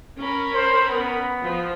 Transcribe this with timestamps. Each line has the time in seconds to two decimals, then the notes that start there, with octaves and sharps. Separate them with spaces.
0.19 C#4 A#4 B5
0.53 C5
0.88 B3
1.43 F3